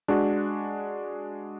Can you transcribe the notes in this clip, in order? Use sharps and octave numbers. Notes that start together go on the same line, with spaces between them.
G#3 D4 F#4